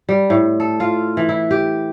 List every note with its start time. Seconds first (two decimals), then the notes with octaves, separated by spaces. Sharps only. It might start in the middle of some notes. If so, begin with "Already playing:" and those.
0.09 G3
0.30 A2
0.60 A4
0.80 F4
1.17 E3
1.29 E4
1.51 G4